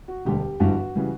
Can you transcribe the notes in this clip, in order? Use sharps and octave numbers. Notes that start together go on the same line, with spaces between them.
F#4
E1 D2 D3 G3 G4
G1 G2 E3 G3 F#4
C#3 E3 G3